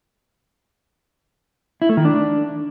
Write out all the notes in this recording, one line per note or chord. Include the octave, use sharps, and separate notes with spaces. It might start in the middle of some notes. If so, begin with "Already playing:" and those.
E4
A3
D#3
D4